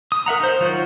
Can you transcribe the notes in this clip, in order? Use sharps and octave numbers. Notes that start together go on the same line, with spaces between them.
D#6
A#4 E5 F#5 A#5
D#4 C5
D#3 F#3 F4 F#4